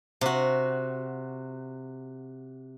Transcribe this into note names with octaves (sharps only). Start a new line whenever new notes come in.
C3 F#4